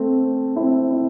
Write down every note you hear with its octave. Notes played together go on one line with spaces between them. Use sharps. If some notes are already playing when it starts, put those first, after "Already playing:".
Already playing: A3 C4
C4 E4
E4